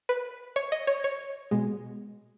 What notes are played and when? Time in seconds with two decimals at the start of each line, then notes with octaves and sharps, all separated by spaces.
0.09 B4
0.56 C#5
0.72 D#5
0.87 C#5
1.04 C#5
1.51 B2 G#3